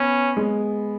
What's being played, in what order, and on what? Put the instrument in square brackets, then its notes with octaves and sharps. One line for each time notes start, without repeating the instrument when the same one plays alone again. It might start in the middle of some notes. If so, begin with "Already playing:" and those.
Already playing: [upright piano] B3 [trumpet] C#4
[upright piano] G#3